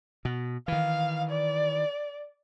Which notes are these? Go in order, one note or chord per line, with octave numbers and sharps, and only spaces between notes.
B2
D#3 E3 F5
D5